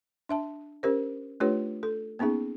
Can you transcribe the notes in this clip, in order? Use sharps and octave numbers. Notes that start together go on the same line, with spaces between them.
D4 E5 A5
C#4 G4 A#4 C5
A3 D4 F4 G4 B4 C#5
A4
A#3 B3 C#4 D#4 G#4